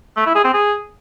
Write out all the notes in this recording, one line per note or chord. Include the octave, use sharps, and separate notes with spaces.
A3
E4
G#4
C4
G#4